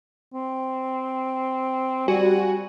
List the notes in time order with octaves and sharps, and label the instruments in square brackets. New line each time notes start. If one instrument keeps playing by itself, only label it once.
[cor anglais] C4
[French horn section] G3 [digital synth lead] F#4 [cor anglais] G#5